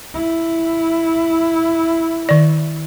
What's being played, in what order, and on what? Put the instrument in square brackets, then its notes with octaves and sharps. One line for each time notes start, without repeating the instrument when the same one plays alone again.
[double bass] E4
[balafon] D#3 D5